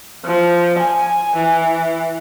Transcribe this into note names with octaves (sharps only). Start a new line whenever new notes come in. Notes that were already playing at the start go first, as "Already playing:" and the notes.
F3
G#5
E3